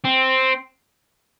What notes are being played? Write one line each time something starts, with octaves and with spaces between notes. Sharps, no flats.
C4